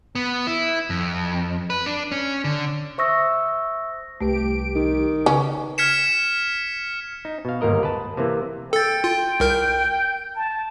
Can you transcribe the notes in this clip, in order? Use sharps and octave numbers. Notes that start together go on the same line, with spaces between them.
B3
E4
F2
B4
D4
C#4
D3
C5 E5 C#6 D#6 E6 A#6
C2 A3 G4 B4 D7
D#3
C#3 C#4 B4
F6 G#6 B6 C#7 E7
D#4
B2 F5
G1 D#2 G#2 A#3 A#4 D#5
B4 A5
C3 E3 A#3
A4 G5 A6
F4
C2 A#4 G6
A5